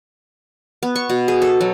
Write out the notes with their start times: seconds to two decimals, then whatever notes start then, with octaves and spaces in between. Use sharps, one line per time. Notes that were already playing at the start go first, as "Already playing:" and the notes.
0.83 B3
0.96 C#6
1.10 B2
1.28 G#4
1.42 A4
1.61 F#3